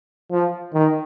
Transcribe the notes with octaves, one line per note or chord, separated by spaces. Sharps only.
F3
D#3